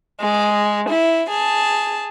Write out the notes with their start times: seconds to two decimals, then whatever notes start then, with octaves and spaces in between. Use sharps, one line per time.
0.19 G#3
0.88 E4
1.28 G#4 A5